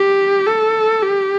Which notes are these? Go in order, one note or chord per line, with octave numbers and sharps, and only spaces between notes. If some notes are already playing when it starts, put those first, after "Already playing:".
Already playing: G4
A4
G4